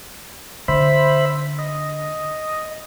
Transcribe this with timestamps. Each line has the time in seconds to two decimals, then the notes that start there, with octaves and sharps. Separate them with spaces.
0.68 D3 C5 E5 B5
1.59 D#5